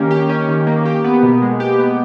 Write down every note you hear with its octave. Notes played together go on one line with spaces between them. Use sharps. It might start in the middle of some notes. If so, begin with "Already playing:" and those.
Already playing: D#3 A#3 C#4 G4
G4
C#4
D#3
A#3
G4
B3
B2
G#3
G4
B3